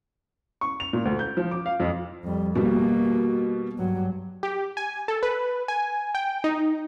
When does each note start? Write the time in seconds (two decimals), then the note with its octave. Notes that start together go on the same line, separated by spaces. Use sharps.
0.61 C#6
0.80 F7
0.93 A#2
1.05 D2
1.19 G6
1.37 F3
1.51 D6
1.66 F5
1.80 F2
2.25 F2 G3
2.55 B2 G3 A#3
3.79 G2 F#3
4.43 G4
4.77 G#5
5.08 A4
5.23 B4
5.68 G#5
6.15 G5
6.44 D#4